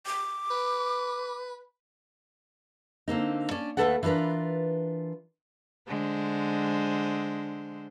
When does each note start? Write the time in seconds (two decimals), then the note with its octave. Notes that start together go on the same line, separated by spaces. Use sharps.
0.06 D6
0.51 B4
3.08 D3 A#3 C4 D#4
3.51 C#4 D4
3.77 D#2 G#3 A3 A4 B4 F#5
4.03 E3 D4 F4 A#4 B4
5.87 D3 G#3 C5